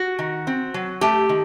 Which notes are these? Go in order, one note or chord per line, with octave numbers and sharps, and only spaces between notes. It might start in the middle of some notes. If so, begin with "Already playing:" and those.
Already playing: F#4
D#3
C4
F#3
A3 G4
D#3